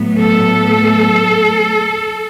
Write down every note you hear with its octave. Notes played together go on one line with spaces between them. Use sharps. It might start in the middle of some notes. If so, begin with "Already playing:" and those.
Already playing: A2 F#3 B3
A4